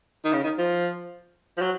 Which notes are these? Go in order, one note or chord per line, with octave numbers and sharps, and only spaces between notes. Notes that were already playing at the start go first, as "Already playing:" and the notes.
D#3
C#3
D#3
F3
F3
F#3